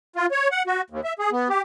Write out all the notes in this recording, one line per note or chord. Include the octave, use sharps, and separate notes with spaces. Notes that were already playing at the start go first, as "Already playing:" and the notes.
F4
C#5
F#5
F#4
D#2
E5
G#4
B3
G4